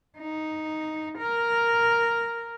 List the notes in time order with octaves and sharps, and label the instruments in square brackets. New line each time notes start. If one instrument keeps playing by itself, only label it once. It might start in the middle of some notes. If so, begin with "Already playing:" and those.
[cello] D#4
A#4